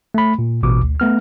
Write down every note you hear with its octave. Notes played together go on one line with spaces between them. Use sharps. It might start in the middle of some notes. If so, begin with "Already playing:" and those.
A3 B5
A#2
A1 B2 D6
D2
A3 B3 F6